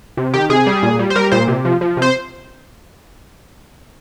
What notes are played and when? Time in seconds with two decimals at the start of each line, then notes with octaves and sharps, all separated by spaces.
0.17 C3
0.34 D#3 G4
0.49 C3 G#4
0.66 G3
0.83 A#2
0.99 G3
1.10 C5
1.15 G3 A#4
1.32 A#2 C5
1.48 C3
1.65 F3
1.81 F3
1.97 C3 C5